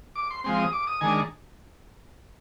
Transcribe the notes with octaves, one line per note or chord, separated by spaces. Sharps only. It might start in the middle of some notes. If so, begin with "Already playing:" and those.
D6
C6
F3 G#3 C4 C6
D#6
D6
D#6
D#3 G#3 D4 G#5